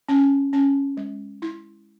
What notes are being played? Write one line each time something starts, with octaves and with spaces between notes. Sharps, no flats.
C#4
C#4
G#3
E4